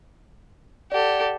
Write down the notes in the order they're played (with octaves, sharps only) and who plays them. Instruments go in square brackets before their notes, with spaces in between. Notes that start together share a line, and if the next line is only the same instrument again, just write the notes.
[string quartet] G4 A4 [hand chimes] D5 F#5